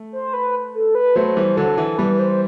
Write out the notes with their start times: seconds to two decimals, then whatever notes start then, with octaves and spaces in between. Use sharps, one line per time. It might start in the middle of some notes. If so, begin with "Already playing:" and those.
Already playing: A3
0.13 C5
0.33 B4
0.75 A4
0.95 B4
1.15 F#3 A3 C5
1.37 E3 G3
1.57 D3 F#3 A4
1.78 E3
1.98 E3 G3 B4
2.19 C5